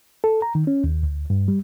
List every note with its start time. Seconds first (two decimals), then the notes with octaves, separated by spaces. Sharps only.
0.24 A4
0.42 A#5
0.55 D#3
0.67 C#4
0.84 D#2
1.03 D2
1.30 G2
1.48 G3